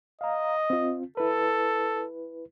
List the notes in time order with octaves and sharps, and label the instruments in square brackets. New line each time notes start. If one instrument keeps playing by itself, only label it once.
[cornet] D#5 [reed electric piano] F5 A#5
[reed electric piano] C4 F4
[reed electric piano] E4 B4 [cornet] A4